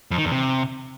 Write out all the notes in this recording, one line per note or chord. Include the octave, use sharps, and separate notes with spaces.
F2
D#3
E2
C3